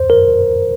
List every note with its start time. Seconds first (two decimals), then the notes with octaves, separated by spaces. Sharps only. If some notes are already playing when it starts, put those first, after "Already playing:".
Already playing: C5
0.10 A#4